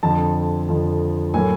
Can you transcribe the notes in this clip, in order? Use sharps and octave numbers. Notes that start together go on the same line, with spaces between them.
F2 D3 F3 A5
F2 D3 F3
A2 F#3 A#3 G#5